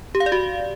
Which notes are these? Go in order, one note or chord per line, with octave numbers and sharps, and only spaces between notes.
G4
F5
D5
F#4